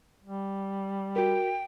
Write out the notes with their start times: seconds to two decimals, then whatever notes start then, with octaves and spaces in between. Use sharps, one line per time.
0.24 G3
1.16 F#4 A#4 G5